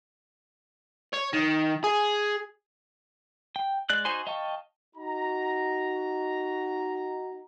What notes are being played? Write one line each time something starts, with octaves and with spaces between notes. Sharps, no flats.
C#5
D#3
G#4
G5
G#3 D5 F#6
D#4 F#4 C5 G#5 C6
D#5 F5 G5 A5 C#6
D#4 F#4 A#5